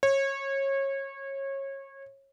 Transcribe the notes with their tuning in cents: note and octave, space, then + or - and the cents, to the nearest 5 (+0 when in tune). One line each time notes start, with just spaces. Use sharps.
C#5 -25